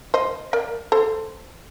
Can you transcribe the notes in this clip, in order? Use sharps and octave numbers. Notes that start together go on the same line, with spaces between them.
C5 D#5
A#4 D5
A4 C5